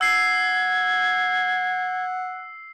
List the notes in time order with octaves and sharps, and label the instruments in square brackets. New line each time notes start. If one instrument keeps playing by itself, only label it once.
[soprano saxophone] F#5 [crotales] E6 C7 [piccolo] G#6